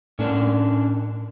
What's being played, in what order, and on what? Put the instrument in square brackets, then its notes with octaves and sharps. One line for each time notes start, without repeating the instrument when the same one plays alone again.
[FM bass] A2 [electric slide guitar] C#4 D4 A#4